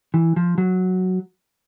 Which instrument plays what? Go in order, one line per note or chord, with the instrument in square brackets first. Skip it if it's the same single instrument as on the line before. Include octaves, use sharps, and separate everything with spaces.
[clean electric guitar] E3
F3
F#3